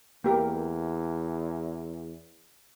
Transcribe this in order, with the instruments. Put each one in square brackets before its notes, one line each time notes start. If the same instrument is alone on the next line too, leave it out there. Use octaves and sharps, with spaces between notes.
[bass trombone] E2 [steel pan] A#3 G4 A#4